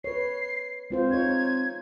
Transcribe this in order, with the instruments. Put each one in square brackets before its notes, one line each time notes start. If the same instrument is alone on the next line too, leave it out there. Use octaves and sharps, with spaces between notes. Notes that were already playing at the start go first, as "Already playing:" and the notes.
[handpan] B4 C#5 [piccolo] C7
[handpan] G#3 F4 C5 [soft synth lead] C4
[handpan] D#4 F4 C#5 [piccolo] G#6